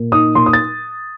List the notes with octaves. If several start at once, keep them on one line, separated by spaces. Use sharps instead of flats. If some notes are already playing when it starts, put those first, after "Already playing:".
Already playing: A#2
D#4 D#6
A#2 C6
D#6
A6